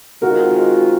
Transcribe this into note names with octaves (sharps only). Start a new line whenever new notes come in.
D#3 G#3 C4 F4 F#4 A#4